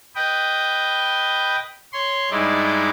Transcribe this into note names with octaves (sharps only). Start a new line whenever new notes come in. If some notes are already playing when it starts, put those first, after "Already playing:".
B4 D#5 G5
C#5 C6
G2 G#3 D#4 E4 D5